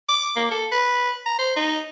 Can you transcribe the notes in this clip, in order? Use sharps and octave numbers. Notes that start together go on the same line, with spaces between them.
D6
A#3
A4
B4
A#5
C5
D#4